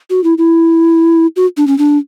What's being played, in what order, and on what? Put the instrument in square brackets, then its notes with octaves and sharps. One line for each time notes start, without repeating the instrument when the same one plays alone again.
[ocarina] F#4
E4
E4
F#4
D4
C#4
D4